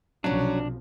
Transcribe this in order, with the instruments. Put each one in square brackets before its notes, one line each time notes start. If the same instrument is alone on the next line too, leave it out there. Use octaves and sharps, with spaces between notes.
[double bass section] B1 C3 F3 [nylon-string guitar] F#3 C#4 [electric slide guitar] D4